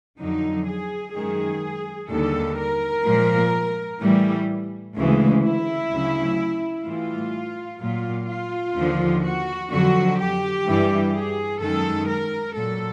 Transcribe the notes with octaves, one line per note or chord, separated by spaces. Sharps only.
F2 D3 F#3 D#4
G#4
F#2 D#3 G#3 G#4
D#2 D3 G3 A4
A#4
A#2 F3 G#3
A2 E3 G3
D2 C#3 E3 G#3
E4
D2 C#3 F#3
A2 E3 G3 F4
A#2 F#3 F4
F4
D#2 D3 F3
F#4
F2 D3 F#3 F#4
G4
G2 E3 G3
G#4
F#2 D#3 G#3 A4
A#4
A#2 F#3 A4